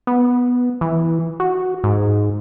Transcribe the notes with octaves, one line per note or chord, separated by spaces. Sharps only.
B3
E3
F#4
G#2